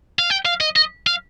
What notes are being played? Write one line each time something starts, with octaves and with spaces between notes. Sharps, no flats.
F5
G5
F5
D#5
D#5
F5